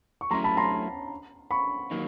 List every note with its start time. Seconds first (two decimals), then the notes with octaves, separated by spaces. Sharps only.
0.21 C#6
0.31 F#3 A3 C#4 E4 A#5 C6
0.44 A5 B5
0.57 A#5 C6
1.51 B5 C#6
1.91 D#3 F#3 A#3 D#4